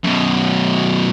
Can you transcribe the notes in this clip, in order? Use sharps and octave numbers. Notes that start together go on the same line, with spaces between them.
F#2 B2